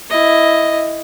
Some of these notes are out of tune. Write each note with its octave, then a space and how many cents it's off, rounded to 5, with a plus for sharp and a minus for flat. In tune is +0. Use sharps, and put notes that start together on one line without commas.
E4 +0 D#5 +0